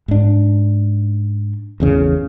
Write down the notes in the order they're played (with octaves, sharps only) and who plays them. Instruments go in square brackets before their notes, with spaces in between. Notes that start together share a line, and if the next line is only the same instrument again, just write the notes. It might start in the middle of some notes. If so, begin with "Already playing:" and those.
[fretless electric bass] G#2 D4
A1 E2 C#3